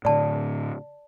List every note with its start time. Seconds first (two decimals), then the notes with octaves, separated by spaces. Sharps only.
0.05 A2 D3 D5 A5